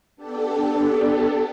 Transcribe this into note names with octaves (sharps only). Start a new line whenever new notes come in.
B3 D4 G4 A4